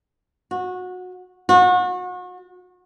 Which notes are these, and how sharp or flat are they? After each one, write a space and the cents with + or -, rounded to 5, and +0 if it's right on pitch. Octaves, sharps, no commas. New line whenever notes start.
F#4 -20
F#4 -35